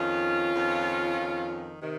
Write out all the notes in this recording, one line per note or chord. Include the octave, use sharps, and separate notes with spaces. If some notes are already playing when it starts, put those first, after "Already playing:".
Already playing: F2 D#3 C#4 F4
F2 D#3
F2 D#3
C3 D#3